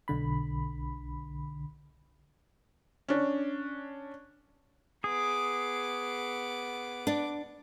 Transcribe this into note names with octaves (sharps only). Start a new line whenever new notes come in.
B1 D3 B5
C#4 D4
B3 G#4 D6
D4